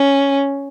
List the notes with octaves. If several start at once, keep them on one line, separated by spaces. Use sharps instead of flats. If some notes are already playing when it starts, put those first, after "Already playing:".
Already playing: C#4